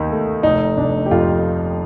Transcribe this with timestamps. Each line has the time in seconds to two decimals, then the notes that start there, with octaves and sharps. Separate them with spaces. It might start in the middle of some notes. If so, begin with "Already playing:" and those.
Already playing: D#2 D#3 D#4
0.10 A3
0.43 F1 D#4
0.77 F1 D4
1.06 G4
1.11 F2 F4